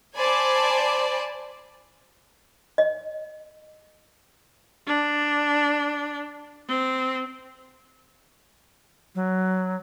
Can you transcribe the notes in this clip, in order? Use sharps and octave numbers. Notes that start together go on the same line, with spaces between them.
C5 D5 G#5 A5 B5
D#5
D4
C4
F#3